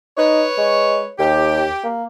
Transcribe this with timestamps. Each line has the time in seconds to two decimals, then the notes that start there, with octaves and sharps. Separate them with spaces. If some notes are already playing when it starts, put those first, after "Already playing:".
0.17 D#4 B4 C#5
0.58 G#3
1.19 D#2 G4
1.84 A#3